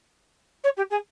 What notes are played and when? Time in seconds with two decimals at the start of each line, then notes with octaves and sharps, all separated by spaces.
0.63 C#5
0.77 G4
0.90 G#4